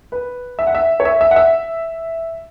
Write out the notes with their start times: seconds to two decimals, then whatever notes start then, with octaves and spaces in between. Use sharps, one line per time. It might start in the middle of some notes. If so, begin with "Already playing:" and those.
0.12 B4
0.59 E5
0.67 F#5
0.75 E5
1.00 C#5
1.05 E5
1.21 E5
1.31 F#5
1.36 E5